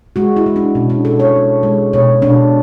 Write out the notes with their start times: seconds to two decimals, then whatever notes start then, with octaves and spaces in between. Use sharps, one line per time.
0.16 G#3 F#4
0.37 E4
0.46 G#3
0.56 D4
0.75 B2 C#4
0.90 D4
1.05 B2 A4
1.20 C#5
1.34 G#3
1.63 G#3
1.93 B2 C#5
2.22 B2 D4